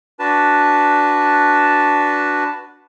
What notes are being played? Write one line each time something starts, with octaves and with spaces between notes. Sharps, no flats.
D4 F#4 B4 A5